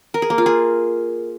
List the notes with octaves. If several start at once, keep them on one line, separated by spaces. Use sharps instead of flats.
A#4
G#4
A#3
F4
G#4